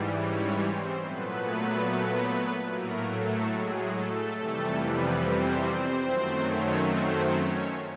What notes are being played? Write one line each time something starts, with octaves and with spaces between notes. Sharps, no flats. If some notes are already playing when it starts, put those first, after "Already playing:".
Already playing: G#2 E3 G3
C#4 C#5
C4 C5
A#2 F#3 A3 B3 B4
A2 F#3 A3 A#3 A#4
A3 A4
G#3 G#4
A3 A4
F2 C3 E3 G3 A3 A4
B3 B4
C4 C5
C4 C5
F#2 D#3 F#3 A3 C4 C5
C#4 C#5
C4 C5
C#4 C#5